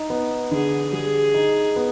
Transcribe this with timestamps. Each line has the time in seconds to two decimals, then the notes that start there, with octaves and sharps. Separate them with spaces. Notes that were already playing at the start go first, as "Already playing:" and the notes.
Already playing: D#4
0.10 B3
0.51 D3 G#4
0.93 G3 G#4
1.34 D#4
1.76 B3